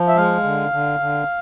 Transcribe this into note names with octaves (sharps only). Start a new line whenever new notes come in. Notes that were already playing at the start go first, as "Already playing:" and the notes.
Already playing: F3
E5
G#3 F5
D3
D3
D3